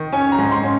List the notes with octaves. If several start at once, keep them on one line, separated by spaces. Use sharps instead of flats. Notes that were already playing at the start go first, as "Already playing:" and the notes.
Already playing: D#3
C#4 G#5
A#5
G#2
C6
C#4